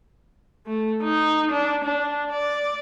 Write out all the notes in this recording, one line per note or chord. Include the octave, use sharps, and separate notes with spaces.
A3
D#4
D4
D4
D5